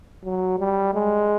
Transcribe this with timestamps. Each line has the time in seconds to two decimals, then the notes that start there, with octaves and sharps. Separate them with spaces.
0.24 F#3
0.58 G3
0.93 G#3